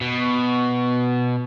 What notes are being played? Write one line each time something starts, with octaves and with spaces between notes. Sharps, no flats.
B2